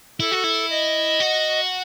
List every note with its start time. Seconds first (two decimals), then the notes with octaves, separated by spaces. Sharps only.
0.20 E4 A4
0.32 F#4
0.44 E4
0.70 D#5
1.20 F#4